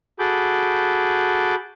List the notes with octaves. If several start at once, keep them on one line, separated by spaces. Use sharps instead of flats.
F#4 G#4 A4 B5 D6 G6